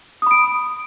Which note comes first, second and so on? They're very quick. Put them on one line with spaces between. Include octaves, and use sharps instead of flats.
D#6 B5 D7